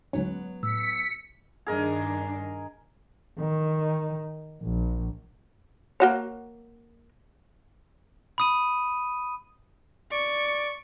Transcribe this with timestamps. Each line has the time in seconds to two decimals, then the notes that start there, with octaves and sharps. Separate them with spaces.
0.13 D2 G#2 F#3 B3 C#4
0.63 A2 E6 B6 C#7
1.67 G2 D#3 D4 G#4 A#4 D#5
3.39 D#3
4.62 A#1
6.00 A#3 F#4 C#5
8.38 B5 D#6 D#7
10.12 D5 C#6